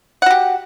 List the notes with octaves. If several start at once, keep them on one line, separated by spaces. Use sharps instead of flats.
F#4 G4 F#5